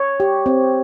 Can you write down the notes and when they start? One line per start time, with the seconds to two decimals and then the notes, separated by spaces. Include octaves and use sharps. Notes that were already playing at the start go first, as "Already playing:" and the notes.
Already playing: C#5
0.20 G4
0.46 C4